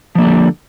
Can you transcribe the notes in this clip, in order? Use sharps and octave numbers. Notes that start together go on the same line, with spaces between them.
D3 F3 G3 A#3